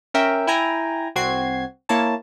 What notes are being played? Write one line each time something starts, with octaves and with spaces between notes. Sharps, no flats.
C#4 A#4 E5 G5
E4 G5 G#5 A#5
C2 C4 F#4 G#6 C7
A#3 E4 C#5 A5